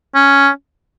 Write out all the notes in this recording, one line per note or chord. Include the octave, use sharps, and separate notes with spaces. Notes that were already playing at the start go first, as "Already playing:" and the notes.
C#4